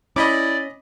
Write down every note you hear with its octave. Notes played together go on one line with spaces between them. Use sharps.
C#4 E4 D5 D#5 B5 D6